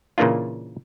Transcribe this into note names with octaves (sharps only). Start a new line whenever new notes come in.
A#2 C#3 E3 A#3 D4 F4